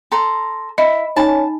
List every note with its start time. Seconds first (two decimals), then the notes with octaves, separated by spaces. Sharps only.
0.12 A4 A#5 C6
0.78 E4 D#5
1.16 C#4 D#4 G#5 A5 B5